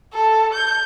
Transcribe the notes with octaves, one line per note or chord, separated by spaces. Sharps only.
A4
G6